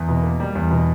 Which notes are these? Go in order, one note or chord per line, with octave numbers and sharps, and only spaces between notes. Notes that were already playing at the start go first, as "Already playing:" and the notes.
Already playing: E2
B2
A#3
G3
E2
B2